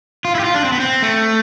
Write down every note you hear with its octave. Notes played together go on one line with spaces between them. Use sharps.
F4
E4
G4
F4
D4
C4
B3
C4
A3